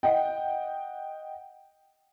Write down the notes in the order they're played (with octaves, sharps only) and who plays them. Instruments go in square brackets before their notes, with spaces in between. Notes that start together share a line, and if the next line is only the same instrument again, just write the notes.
[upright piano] D#5 F#5 G5